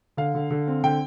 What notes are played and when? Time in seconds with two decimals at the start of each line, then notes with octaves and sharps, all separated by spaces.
0.17 D3 F5
0.35 D3
0.51 D3
0.68 C4
0.83 D3 G5